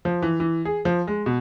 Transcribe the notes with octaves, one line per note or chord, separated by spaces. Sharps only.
F3
E3
E3
G#4
F3
G#3
B2